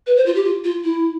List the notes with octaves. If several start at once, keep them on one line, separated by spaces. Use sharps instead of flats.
B4
C5
F4
G4
F4
F4
E4